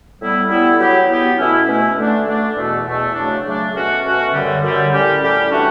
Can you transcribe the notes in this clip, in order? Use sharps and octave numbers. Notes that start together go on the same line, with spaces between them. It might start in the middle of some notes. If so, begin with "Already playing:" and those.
A2 G3 B3 E4
A2 G3 B3 E4
F#3 B3 E4 G4
F#3 B3 E4 G4
B2 A3 C#4 E4
B2 A3 C#4 E4
D3 A3 D4
D3 A3 D4
E2 B2 A3
E2 B2 A3
C#3 F#3 A3 D4
C#3 F#3 A3 D4
B2 A3 C#4 F#4
B2 A3 C#4 F#4
F#2 D3 G3
F#2 D3 G3
A2 G3 C#4 G4
A2 G3 C#4 G4
E3 A3 D4 F#4